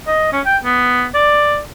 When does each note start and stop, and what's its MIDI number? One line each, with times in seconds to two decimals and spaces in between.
0.07 0.29 75
0.33 0.41 61
0.46 0.57 79
0.64 1.06 59
1.14 1.59 74